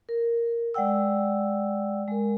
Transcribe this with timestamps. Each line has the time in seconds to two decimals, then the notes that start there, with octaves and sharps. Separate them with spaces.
0.09 A#4
0.74 G#3 D5 F#5 G5 E6
2.08 G#3 A#4